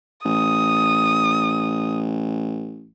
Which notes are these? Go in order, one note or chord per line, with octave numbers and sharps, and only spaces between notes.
A1 D#6